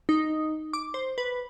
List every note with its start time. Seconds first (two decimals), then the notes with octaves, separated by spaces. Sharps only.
0.09 D#4
0.73 D6
0.94 C5
1.18 B4